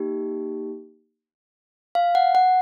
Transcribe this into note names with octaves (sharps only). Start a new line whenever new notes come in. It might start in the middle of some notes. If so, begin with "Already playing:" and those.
Already playing: A#3 D#4 G4
F5
F#5
F#5